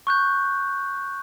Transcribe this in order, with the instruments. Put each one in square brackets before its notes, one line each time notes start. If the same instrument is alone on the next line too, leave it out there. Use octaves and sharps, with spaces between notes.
[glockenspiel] C#6 F#6 G6